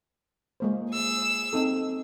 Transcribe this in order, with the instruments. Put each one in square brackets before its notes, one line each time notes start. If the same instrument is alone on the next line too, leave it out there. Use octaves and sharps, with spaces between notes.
[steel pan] G#3 A#3 C5
[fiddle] G#4 E6
[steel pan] C4 D#4 A4